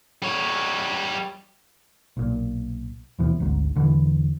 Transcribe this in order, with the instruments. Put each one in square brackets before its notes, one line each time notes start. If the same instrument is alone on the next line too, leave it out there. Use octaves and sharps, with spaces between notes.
[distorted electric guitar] G3 C#5
[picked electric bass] B1 A#2
D#2 B2 E3 F3
G#1 D2 G#2
E1 D3 E3